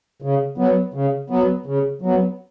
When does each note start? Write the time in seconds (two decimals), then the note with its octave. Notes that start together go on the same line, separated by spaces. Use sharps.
0.22 C#3
0.58 F#3 B3
0.94 C#3
1.30 F#3 B3
1.66 C#3
2.02 F#3 B3